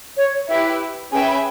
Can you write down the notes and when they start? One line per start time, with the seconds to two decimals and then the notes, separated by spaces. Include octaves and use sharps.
0.17 C#5
0.48 E4 G4 B4 E5
1.11 C#4 G#4 B4 E5 G5 G#5
1.28 B5